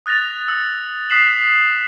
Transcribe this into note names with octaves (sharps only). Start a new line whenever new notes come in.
D#6 F#6 A6 A#6 F7
E6
D#6 F#6 B6 C7 E7 F#7